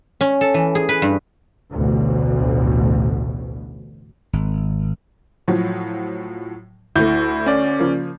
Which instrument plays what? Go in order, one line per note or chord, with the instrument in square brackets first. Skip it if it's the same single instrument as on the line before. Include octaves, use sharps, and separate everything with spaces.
[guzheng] C#4
A4
E3
G#4
B4
G2
[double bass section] A1 D2 B2
[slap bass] G#1
[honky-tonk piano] A2 F3 F#3
[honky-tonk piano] D2 A3 [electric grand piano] E4 G6
[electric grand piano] C#4 D5
[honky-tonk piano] C#3 F3 A#3